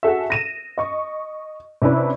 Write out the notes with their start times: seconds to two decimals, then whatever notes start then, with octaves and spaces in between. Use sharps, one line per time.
0.03 F#4 G#4 A4 E5
0.30 A#6 D#7 E7
0.78 D#5 C#6
1.82 C3 C#4 D4 E4 B4